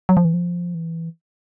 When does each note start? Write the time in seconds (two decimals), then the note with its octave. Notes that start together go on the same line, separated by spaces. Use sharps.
0.09 F#3
0.17 F3
0.25 E3
0.34 F3
0.75 E3